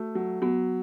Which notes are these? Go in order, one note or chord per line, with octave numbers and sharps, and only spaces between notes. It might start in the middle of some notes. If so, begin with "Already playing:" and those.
Already playing: A3 F#4
F#3
F#3 B3